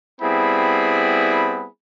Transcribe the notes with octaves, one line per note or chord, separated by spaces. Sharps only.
G3 B3 C4 E4 G#4 B5